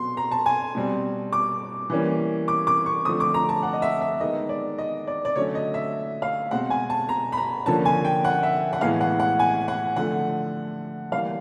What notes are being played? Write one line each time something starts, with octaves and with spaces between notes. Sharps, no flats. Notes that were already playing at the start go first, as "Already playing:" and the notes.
Already playing: B2 F#3 B3 C6
A#5
A5
G#5
B2 G3 C4
D6
E3 G3 A#3 C#4
D6
D6
C#6
D3 F3 A3 C4 D#6
D6
A#5
A5
F#5
D#5
E5
E5
D#3 G#3 B3 D#5
D5
D#5
D5
D5
D3 F#3 A3 C#4 C#5
D#5
E5
F5
B2 G#3 C4 F#5
G#5
A5
A#5
B5
A#5
D3 F3 A#3 C#4 A5
G#5
G5
F#5
E5
F#5
A2 E3 G#3 B3 F5
F#5
F#5
G#5
F#5
D3 F3 A3 F#5
E3 G3 A#3 F5